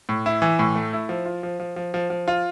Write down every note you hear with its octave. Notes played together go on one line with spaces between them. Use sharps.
A2
E4
E3
A2
A3
E4
F3
F4
F3
F3
F3
F3
F3
F4